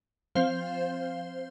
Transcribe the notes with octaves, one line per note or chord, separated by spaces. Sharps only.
F3 C4 C5 F5